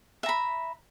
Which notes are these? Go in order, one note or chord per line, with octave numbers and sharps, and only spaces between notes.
E5 A#5 B5